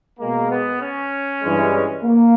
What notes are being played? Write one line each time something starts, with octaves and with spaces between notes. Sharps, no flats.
B2 G#3 A#3
B3
C#4
G2 E3 G#3
A#3